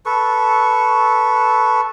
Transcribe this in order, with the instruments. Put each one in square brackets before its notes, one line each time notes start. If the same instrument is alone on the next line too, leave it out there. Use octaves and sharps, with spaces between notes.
[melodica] A4 B4 C#6